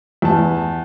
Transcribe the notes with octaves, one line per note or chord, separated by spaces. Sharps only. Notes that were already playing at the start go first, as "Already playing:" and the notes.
E2 A5